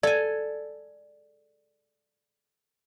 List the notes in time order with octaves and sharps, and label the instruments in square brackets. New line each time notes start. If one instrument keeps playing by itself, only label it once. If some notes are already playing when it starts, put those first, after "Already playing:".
[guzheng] A4 G#5 [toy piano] D5